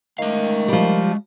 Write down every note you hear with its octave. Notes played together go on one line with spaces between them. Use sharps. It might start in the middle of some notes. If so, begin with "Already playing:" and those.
D#3 G#3 A3 F5
F3 G3